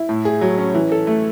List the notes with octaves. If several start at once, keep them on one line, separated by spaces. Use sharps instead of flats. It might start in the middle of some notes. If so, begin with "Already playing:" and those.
Already playing: E4
A2
G#4
F#3
C#4
E3
A4
A3